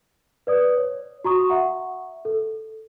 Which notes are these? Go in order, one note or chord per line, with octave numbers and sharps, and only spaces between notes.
B4 D5 D#6
C#5
F#4 A#5 C#6 D#6
E5 F#5 C#6
A4